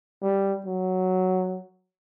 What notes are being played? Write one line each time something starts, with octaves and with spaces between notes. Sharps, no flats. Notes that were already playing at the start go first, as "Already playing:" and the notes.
G3
F#3